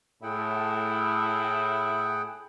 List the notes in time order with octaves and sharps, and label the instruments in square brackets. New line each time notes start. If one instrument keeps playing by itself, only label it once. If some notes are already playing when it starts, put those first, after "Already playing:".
[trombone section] A2 [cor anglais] E4 [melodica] G#4 F#5 G5